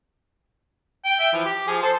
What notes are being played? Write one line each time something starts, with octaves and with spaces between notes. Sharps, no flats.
G5
E5 G5
E3 F3
G4
F3 G#4
A4 C5